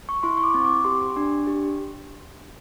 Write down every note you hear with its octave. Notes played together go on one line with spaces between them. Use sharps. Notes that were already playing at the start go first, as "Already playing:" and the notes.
C#6
E4 C6
C#6
D6
C4
D6
G4 C6
D4
G4